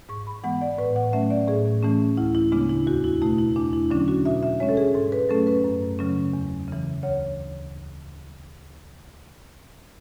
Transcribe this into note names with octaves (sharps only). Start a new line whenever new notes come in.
G#2 C#6
B5
E3 G#3 B3 F#5
D5
A2 B4
F#5
F#3 A3 C#4 E5
D5
A2 G#4
E3 A3 C#4
D2 E4
E4
C#3 G#3 B3 D4
E4
E2 F#4
E4
B2 A3 E4
E4
E2 D4
E4
D3 F#3 C#4 D4
F#4
B2 E5
E5
G#3 C#4 C#5
A4
G#4
G#2 A4
B4
F#3 A3 C#4 A4
B4
F#2
C#3 F#3 C#4
E2
C#3 E3
D2 C#5